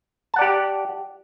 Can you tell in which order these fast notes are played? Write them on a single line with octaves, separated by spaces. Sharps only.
A5 F#5 D5 G4